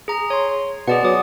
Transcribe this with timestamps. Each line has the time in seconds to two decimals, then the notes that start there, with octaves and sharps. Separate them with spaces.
0.08 G#4 A#5
0.30 C#5 C6
0.88 B2 G#4 D5 F#5
1.04 F#3 D6 D#6